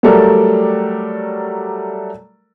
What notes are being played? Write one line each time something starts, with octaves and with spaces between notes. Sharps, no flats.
F#3 G3 A3 A4 A#4 D5